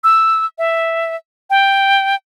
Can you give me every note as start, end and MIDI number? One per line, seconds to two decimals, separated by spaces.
0.04 0.46 88
0.58 1.16 76
1.50 2.15 79